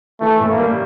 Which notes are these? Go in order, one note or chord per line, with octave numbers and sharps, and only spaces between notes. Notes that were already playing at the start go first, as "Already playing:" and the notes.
E3 A3
A2
A#3
G3